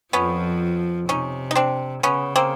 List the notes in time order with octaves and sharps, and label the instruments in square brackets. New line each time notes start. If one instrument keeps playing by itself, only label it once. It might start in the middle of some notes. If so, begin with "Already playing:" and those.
[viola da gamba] F2 F3 [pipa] B3 C#4
[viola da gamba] C3 [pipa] C#4 D#4
[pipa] D#4
C4 D4
[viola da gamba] C#3 [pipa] B3 C#4
[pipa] A#3 C4